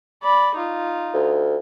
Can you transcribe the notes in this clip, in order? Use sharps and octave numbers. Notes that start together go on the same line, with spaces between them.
D5 B5
D#4 F4
D2